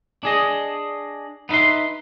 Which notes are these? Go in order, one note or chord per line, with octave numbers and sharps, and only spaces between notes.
D4 G#4 D#5
B3 D#4 B4 E5 C6